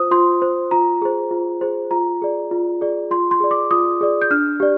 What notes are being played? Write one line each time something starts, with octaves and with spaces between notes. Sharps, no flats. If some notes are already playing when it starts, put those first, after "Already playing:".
Already playing: F4 C5 D#6
F4 C6
C5
F4 A#5
G#4 C5
F4
G#4 C5
F4 A#5
G#4 D5
F4
G#4 D5
F4 C6
C6
G#4 D5
D6
F4 D#6
G#4 D5
G6
D4 F6
G4 D5